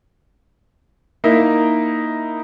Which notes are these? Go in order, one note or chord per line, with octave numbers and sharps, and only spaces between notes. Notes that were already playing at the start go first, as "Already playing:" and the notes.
A#3 D#4 E4 A#4 E5